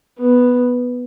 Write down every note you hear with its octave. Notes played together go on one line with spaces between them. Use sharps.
B3